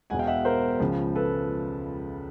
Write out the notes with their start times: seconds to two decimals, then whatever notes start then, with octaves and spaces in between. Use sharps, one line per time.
0.10 E1 E2 B2 F#5 G#5
0.19 F5 G5
0.27 E5 F#5
0.45 A#4 C5
0.80 C#2 C#3 F3
1.15 A4 B4